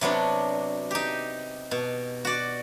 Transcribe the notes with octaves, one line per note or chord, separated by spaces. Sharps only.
C3 F#3 B3 D4
D#4 G4
B2
F#4 D5